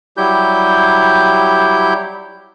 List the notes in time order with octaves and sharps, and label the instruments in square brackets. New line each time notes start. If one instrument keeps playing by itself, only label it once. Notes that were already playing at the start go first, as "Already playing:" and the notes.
[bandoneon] F#3 G3 E4 G4 G6